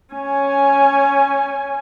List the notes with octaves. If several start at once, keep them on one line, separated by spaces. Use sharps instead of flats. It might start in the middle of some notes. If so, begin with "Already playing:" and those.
C#4 G#5